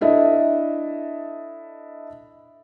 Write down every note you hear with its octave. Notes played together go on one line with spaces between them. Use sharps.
D4 E4 A4 D#5 E5